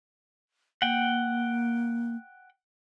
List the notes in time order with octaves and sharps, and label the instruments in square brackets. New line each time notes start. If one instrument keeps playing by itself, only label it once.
[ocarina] A#3 [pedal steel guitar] F#5 G5